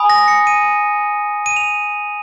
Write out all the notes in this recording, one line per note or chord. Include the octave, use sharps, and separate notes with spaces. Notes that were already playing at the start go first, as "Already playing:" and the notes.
Already playing: G#5 B5 D#6
A#6
C#7
D#7
D#7
F7